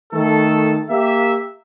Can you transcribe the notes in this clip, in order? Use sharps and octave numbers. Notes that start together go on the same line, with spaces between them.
D#3 A3 A4
A#3 G4 E5